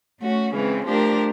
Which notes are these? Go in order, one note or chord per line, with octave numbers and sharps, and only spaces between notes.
A3 C#4 F#4
C#3 E3 G#3 C4
F3 A3 D4 G4 A#4